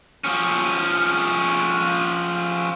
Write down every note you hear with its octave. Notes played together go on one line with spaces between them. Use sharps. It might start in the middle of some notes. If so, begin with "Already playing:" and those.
F3 C#4